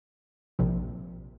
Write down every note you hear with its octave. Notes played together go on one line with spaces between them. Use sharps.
A#1 C3